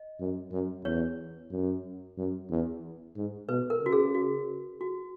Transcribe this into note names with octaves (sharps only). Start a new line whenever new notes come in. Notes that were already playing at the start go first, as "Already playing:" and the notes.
Already playing: D#5
F#2
F#2
E2 C#5
F#2
F#2
E2
G#2
B2 B4
A#4
C#3 F#4
G#4
F#4
F#4